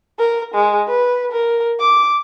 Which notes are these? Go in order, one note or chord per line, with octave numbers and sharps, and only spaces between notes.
A#4
G#3
B4
A#4
D6